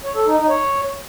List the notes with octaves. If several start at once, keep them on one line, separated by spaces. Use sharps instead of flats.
C#5
A4
D#4
D#4
C#5